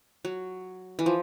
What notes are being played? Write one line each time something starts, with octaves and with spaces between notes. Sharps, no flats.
F#3
E3
F3